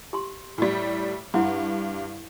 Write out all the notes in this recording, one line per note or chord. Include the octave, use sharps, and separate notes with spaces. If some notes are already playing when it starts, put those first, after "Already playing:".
G4 C6
A2 G3
G2 E4 F#5 C6